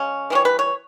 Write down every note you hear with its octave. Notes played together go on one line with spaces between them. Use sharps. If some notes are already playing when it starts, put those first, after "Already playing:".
Already playing: C#3 G#3 C#4
E3 G3 C#4 C#5
B4
C#5